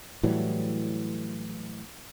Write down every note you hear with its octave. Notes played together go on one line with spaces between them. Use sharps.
A2 E3 F#3 G3